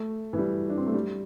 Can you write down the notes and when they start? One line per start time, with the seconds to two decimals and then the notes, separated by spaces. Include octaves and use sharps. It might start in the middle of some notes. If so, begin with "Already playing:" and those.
Already playing: A3
0.33 E3
0.38 G3
0.70 D4
0.78 C4
0.86 A3
0.94 G3